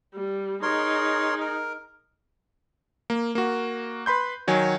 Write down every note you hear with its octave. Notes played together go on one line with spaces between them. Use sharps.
G3
D#4 G#4 A#4 C#5 C6
A#4
A#3
A#3 F#4
B4 B5 C6 G6
D#3 F#3 C#5 G#5